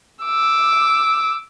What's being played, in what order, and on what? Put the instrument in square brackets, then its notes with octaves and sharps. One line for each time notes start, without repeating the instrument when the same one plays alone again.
[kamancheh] D6 E6